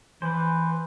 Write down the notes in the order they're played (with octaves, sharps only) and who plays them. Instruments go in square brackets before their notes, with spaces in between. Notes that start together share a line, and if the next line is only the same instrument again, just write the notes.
[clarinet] E3 [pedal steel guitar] B4 C5